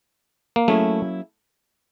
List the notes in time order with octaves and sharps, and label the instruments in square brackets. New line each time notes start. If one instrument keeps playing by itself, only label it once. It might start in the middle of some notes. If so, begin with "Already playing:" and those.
[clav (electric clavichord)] A#3
[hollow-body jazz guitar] F#3 A#3 C#4 E4 G#4 [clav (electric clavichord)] A3